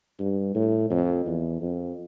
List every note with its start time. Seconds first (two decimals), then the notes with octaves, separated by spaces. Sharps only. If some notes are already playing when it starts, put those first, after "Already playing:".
0.20 G2
0.55 A2
0.91 F2
1.26 E2
1.61 F2